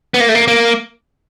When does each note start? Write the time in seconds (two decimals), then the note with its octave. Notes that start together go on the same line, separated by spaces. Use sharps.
0.14 B3
0.20 A#3
0.29 A3
0.35 A#3
0.48 A#3